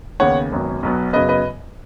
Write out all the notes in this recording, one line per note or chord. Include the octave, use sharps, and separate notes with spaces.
D#2 C#3 B3 C#5 F#5
G#1 F#2 F#3 B3
B1 B2 F#3 B3
F#2 C#3 F#3 B3 B4 D#5
B4 D#5